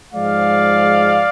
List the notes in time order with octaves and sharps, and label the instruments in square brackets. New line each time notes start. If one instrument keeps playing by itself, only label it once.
[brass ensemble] G#2 F3 G#3 D5 F5